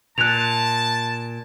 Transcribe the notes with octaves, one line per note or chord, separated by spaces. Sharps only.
A#2 A5 F#6 F7